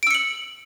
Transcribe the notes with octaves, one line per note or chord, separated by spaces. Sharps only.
E6 C#7 D7 F#7